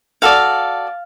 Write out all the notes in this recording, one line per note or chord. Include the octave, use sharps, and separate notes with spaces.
F#4 A4 D5 F5